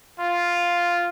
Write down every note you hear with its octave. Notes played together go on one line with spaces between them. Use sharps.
F4